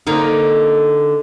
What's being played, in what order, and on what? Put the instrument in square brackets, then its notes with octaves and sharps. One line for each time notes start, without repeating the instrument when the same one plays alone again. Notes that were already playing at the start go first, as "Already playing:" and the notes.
[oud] D3 A#3 D#4